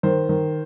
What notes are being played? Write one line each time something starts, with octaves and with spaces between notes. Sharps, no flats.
D#3 C5
D#3